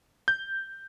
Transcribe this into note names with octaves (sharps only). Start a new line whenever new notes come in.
G6